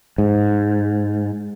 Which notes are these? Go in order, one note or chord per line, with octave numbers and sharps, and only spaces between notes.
G#2